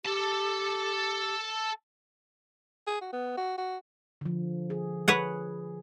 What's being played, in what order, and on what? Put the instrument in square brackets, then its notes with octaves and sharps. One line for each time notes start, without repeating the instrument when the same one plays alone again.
[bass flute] G4 [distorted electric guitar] A4 A5
[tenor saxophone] G#4
F#4
B3
F#4
F#4
[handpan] D3 F3
G#4
[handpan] G#4 [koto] B4 C#5 F#5